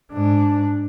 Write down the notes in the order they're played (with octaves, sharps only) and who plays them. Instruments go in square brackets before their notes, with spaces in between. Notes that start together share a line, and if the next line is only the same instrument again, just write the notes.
[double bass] G#2 D4